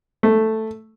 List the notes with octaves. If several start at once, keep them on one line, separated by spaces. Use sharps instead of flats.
A3